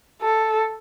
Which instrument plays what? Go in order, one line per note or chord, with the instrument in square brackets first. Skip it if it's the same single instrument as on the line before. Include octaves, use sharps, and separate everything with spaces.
[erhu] A4